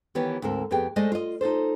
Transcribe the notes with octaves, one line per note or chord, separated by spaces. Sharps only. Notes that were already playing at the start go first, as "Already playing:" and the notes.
D#3 E3 B3 G4 C#5
D2 G#2 C4 A4 A#4
F2 B3 G4 G#4 G5
G#3 A3 C5 D5 D#5
F4 D#5
D#4 F4 A4 C5